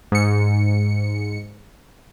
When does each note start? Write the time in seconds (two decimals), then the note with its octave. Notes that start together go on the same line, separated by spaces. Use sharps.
0.12 G#2 C#7